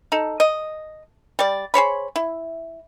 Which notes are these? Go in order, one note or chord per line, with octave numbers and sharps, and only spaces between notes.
D#4 A4
D#5
G3 D5
G#4 C5 C#5 B5
E4